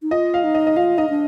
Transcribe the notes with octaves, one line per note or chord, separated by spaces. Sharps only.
D#4
F4 D#5
F5
D#4
D#5
D#5
F4 F5
D#4 D#5
D4